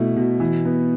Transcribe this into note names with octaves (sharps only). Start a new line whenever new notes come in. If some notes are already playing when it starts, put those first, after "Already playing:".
Already playing: B2 A3 E4
B2
E3
B3